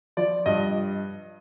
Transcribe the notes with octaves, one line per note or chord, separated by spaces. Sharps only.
F3 D5
G2 D#5